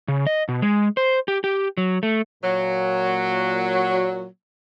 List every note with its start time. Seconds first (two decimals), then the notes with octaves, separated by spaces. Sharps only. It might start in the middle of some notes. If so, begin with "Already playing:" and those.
0.08 C#3
0.26 D#5
0.49 B2
0.62 G#3
0.97 C5
1.28 G4
1.44 G4
1.77 F#3
2.03 A3
2.43 A#2 F#3